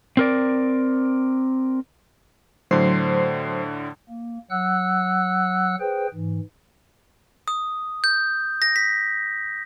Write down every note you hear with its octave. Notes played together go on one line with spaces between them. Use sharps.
C4 A#4 D5
A2 D3 F#3 C5 C7
A#3
F#3 F#5 E6 F#6
G#4 B4 C5 G5
G#2 E3
D#6
G6
A#6
B6